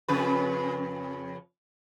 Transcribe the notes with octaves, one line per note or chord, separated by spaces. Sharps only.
F2 C#3 B4